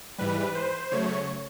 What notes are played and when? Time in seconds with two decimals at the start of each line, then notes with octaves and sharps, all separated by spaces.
0.18 G#2 E3 G3 B4
0.55 C5
0.92 C#3 F#3 A3 C#5